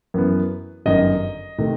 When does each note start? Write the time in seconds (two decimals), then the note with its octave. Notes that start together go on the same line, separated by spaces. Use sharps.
0.14 F#2 E3 B3
0.86 G1 F#2 D#3 D#5
1.58 C3 D#3 A3